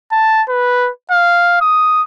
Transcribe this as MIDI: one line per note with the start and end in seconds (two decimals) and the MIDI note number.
0.12 0.43 81
0.49 0.90 71
1.11 1.57 77
1.61 2.02 87